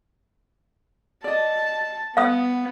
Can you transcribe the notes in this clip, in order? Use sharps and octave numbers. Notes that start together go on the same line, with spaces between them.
D5 D#5 A5
B3 B4 F5 F#5 D#6